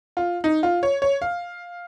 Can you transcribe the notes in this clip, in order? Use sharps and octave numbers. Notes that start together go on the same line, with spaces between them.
F4
D#4
F4
C#5
C#5
F5